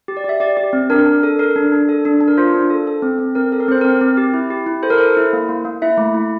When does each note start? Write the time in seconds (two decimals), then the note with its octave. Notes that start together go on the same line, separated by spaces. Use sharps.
0.08 G4
0.17 D5
0.24 G4 E5
0.40 G4 D5
0.57 G4
0.73 C4
0.90 D4 A#4
1.06 D4
1.23 A4
1.39 A4 A#4
1.56 D4
1.72 D4
1.89 A4
2.05 D4
2.21 D4
2.28 A#4
2.37 F4 C5
2.54 D4
2.70 A4
2.87 A4
3.02 C4
3.19 C4
3.35 C4 A#4
3.52 A4
3.60 A#4
3.68 C4 C5
3.81 C4 A#4
4.01 C4
4.17 G4
4.34 E4
4.50 G4
4.67 E4
4.83 A4 C5
4.90 A#4
4.98 A4 C5
5.17 E4
5.33 A#3
5.49 A#3
5.65 A#3
5.82 E4 E5
5.97 A3
6.15 E4